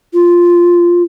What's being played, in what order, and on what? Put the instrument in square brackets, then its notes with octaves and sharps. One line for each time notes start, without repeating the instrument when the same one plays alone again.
[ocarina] F4